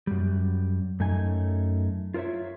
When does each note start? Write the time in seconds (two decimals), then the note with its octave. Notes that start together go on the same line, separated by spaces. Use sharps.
0.07 F#2 G3
1.00 F#2 A3 D#4 G#5
2.14 F4 A#4 C5 C#5 E5